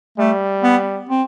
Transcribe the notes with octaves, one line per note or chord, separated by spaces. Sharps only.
G3 A3
B3
C4